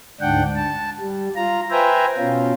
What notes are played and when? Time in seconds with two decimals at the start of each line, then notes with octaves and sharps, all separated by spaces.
0.21 D2 G#2 D4 F#5 G5
0.56 A5
1.00 G3
1.36 F4 A#5
1.71 B4 C5 E5 G5 G#5 A#5
2.18 B2 C#4 F4